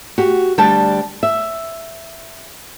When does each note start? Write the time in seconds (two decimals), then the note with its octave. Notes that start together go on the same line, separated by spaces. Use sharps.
0.18 F#4 G4
0.58 D2 G3 D4 G5 A5
1.23 E5